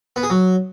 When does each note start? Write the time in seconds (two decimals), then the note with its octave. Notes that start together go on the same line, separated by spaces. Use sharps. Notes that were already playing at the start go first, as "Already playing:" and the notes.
0.16 B3
0.23 G#4
0.30 F#3